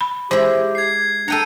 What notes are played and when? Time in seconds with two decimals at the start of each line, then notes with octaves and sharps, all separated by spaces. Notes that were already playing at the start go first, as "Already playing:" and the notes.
0.01 B5
0.31 G#3 E4 G4 C5
0.75 G#6 C7
1.28 D4 A4 G5 A#5 C#7 D#7